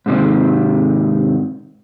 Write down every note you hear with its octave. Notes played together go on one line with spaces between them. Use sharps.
G#2 C3 D#3